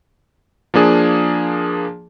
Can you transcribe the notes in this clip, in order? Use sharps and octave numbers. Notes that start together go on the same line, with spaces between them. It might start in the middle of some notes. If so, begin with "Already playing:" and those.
F3 A#3 D4 G#4